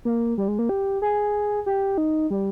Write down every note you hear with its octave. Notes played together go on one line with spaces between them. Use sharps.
A#3
G3
G#3
A#3
G4
G#4
G4
D#4
G3